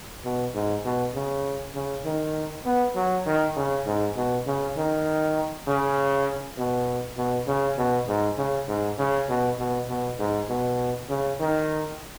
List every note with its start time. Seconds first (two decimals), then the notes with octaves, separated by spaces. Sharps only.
0.24 B2
0.54 G#2
0.85 B2
1.15 C#3
1.75 C#3
2.05 D#3
2.66 B3
2.95 F#3
3.26 D#3
3.56 C#3
3.86 G#2
4.16 B2
4.47 C#3
4.77 D#3
5.67 C#3
6.58 B2
7.17 B2
7.47 C#3
7.77 B2
8.08 G#2
8.38 C#3
8.68 G#2
8.98 C#3
9.29 B2
9.59 B2
9.88 B2
10.19 G#2
10.49 B2
11.09 C#3
11.40 D#3